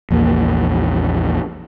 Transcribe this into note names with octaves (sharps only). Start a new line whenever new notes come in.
A#1 E2 A#3